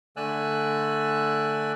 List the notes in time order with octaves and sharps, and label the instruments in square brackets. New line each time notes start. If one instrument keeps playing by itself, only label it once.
[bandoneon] D3 A3 D5 G#5 E6 F#6